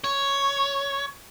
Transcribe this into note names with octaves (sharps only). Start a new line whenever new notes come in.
C#5